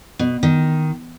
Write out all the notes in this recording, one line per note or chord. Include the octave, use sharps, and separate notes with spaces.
B2
D#3